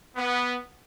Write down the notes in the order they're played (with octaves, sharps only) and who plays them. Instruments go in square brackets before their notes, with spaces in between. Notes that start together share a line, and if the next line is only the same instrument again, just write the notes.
[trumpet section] B3